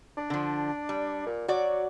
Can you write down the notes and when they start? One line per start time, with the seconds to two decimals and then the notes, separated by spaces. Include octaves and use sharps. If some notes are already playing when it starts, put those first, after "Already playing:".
0.17 D4
0.30 D3 F3
0.89 G3
1.26 A#2
1.48 F#3 F#4 D5